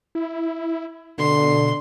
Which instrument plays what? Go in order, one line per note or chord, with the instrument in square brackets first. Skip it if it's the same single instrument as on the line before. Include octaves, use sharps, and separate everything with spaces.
[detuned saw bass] E4
[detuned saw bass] B2 [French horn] D3 [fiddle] C6